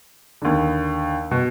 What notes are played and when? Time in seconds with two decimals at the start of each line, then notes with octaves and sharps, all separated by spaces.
0.42 D#2 D3
1.31 B2